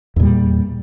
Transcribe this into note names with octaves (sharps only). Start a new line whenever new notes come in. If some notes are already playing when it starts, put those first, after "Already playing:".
E2 A#2 G3